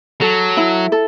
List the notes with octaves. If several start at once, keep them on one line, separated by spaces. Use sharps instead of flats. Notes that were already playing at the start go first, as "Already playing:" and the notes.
F#3 A4
E4
A4